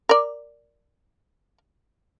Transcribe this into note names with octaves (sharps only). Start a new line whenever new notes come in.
A#4 D5